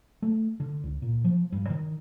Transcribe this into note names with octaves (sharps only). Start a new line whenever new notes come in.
A3
D3
C#2
A#2
F3
G2
D#3